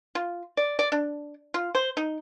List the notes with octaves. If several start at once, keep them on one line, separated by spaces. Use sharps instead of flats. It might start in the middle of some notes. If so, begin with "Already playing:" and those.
F4
D5
D5
D4
F4
C5
D#4